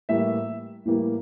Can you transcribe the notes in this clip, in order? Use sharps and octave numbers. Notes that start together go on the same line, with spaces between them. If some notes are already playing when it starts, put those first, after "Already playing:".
A2 E3 G3 A#3 E5
A2 E3 G3 A#3